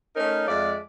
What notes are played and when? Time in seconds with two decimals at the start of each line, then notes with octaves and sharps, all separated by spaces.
0.16 A3 C#4 D#4 A#4
0.48 F2 G#3 D5 E5 F5